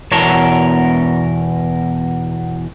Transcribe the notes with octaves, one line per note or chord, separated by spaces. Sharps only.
E2 B2 A#4 C#5 A5